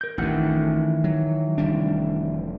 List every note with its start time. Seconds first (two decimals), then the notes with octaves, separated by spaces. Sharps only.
0.01 A#4 G6
0.18 A1 F2 D#3 E3 F#5
1.04 F#3
1.58 F1 G3 D4